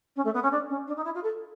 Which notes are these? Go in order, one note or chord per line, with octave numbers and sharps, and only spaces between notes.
C#4
A3
B3
C#4
D4
C#4
D4
D#4
E4
F4
A4